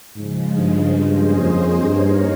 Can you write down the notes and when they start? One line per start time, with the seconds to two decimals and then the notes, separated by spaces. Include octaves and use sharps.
0.15 G#2 C#3 F3 G#3
0.57 G2
0.99 A#3 C#4 G#4 C5 D#5
1.39 F2
1.81 G2 A#3 D#4 A#4 C#5